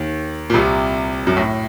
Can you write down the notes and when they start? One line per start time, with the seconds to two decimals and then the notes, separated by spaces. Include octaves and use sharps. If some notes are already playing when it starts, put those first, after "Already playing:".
Already playing: D#2 D#3
0.50 A#2
0.54 C2 C3
1.27 F#2
1.37 A2